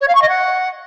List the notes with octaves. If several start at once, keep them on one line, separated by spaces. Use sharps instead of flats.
C#5
F5
C#6
D#5
F#5